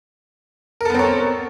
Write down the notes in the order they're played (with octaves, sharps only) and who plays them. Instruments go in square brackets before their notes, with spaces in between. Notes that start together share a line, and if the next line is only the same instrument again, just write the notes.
[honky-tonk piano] A#4
A4
B3
C4
C#5